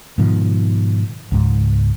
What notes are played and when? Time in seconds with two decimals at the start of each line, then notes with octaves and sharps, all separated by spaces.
0.18 G#2 B2 D#3 F3
1.32 C#2 G#2